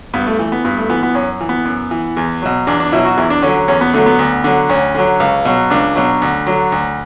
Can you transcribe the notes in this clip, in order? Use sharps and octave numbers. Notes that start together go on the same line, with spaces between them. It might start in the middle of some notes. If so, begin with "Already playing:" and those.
G2 B3
A3
E3 A3
B3
G2 B3
A3
E3 B3
B3
F#2 C#4
E3
B3
F#2
E3
E2
B2 F#3
E2 D4
D4
B2 F#3 E4
F#4
E2 E4
D4
D3 F#3 C#4
E2 C#4
B3
D3 F#3 A3
B3
D2
D3 F#3
D2 C#4
D3 F#3
C#2
B2 F#3
C#2 D4
B2 F#3
D2
D3 F#3
D2